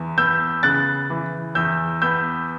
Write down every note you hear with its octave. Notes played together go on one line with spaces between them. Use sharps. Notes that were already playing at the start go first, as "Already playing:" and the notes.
Already playing: E2 E3
B3 E6 G6
C#3 F#6 A6
E3
E2 E6 G6
B3 E6 G6